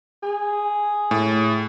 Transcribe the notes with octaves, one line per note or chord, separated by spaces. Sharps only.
G#4
A2